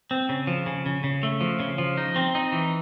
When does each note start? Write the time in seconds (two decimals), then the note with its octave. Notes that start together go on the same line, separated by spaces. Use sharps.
0.11 C4
0.29 C#3
0.47 F3
0.66 C#3
0.86 C#3
1.04 C#3
1.23 A3
1.41 F3
1.60 C#3
1.78 F3
1.97 D#4
2.16 C4
2.35 D#4
2.52 E3